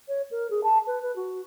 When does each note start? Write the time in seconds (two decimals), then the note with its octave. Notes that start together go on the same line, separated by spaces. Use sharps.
0.08 C#5
0.31 A#4
0.50 G#4
0.63 A5
0.87 B4
1.02 B4
1.16 F#4